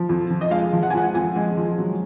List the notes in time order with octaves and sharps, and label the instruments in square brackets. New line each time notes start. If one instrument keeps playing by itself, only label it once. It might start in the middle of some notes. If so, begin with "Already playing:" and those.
Already playing: [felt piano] F3
F2
F3
D#5
G#3 F5
F3
F#5
G#5
F3 F#5
F2 G#5
G#3
F3
F#3